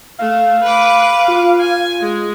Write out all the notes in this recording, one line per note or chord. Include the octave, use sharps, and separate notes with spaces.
A3 F5
B4 D6
F4
G#5
G#3